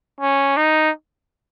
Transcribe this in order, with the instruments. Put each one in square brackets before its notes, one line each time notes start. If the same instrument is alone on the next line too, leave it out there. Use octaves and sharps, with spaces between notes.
[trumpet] C#4
D#4